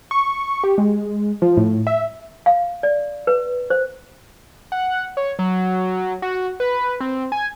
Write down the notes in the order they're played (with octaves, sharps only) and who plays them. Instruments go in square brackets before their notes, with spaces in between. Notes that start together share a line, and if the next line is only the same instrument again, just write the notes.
[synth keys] C#6
G4
G#3
F3
A2
E5
[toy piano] F5
D5
B4
C5
[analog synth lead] F#5
C#5
F#3
F#4
B4
C4
G#5